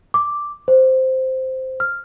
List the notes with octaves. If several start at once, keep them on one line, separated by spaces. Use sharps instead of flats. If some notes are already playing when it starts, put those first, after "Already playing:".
D6
C5
F6